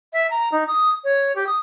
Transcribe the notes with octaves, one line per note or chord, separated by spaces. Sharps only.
E5
A#5
D#4
D#6
C#5
G4
D#6